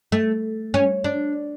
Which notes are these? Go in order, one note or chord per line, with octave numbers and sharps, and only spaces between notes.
A3
C#4
D4